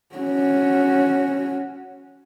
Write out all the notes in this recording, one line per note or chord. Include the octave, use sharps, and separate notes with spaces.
C#4 F#4